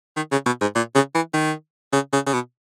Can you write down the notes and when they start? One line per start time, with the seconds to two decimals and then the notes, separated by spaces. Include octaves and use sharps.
0.16 D#3
0.32 C#3
0.46 B2
0.61 G#2
0.75 A#2
0.95 C#3
1.15 E3
1.34 D#3
1.93 C#3
2.13 C#3
2.26 C#3
2.33 B2